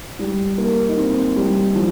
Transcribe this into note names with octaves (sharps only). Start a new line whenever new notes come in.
G3
A#3
D#4
C4
G3
F3